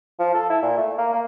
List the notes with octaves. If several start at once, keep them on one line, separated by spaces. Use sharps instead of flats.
F3
A4
E4
A#2
A3
A#3
A#3